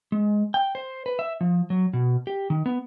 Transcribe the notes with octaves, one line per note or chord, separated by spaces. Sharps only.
G#3
G5
C5
B4
E5
F3
F#3
B2
G4
D#3
B3